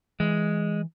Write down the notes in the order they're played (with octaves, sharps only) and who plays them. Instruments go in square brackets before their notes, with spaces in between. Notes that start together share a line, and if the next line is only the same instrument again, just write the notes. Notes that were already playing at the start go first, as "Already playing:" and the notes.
[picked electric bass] E3 [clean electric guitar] G#3